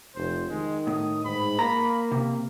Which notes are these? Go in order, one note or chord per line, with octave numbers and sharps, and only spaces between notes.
F1 C5
D#3 G#3
A2 D#6
G#2 B5
A#3 A#5
C3